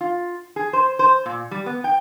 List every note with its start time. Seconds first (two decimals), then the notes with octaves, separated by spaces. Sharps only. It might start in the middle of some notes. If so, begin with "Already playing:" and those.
0.01 F4
0.56 G#4
0.73 C5
0.99 C5
1.26 A#2
1.51 G3
1.66 B3
1.84 G5